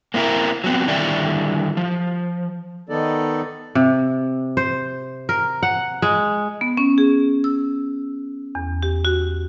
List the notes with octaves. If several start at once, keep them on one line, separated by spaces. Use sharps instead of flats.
A#3 C4 E4 F4 A#4
F#3 B3 C4
D3 D#3 G3 E4 D5
F3
D#3 B3 D#4 A4 D5
C3
C5
A#4
F#5
G#3
B3
C#4
G#4
E6
E2
G4
F#4